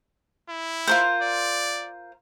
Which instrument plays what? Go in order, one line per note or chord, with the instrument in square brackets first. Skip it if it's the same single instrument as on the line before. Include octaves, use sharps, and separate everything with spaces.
[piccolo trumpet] E4
[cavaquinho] F4 A#4 C5
[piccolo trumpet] D5